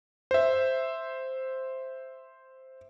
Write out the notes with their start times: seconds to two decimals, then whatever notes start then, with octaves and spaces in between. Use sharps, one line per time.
0.31 C5 E5